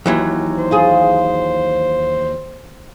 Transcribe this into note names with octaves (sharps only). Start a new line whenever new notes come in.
D#2 E3 F#3
C5
F4 G#4